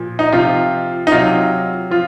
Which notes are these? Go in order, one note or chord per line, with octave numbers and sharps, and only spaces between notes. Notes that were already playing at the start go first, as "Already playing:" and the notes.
Already playing: A#2 F3
D#4
C3 F3 F4
D#4
C3 F#3 F4
F3 F4